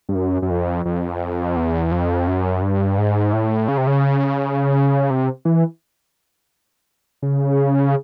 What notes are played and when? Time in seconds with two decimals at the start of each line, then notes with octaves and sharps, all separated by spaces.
0.09 G2
0.15 F#2
0.42 F#2
0.50 F2
0.85 F2
1.56 E2
1.92 F2
2.27 F#2
2.62 G2
2.98 G#2
3.33 A2
3.68 C#3
3.78 C3
3.87 C#3
5.10 C3
5.45 E3
7.22 C#3